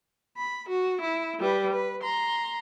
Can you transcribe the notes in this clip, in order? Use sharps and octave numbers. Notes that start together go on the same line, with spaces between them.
B5
F#4
E4
G3 B4
B4
A#5 C6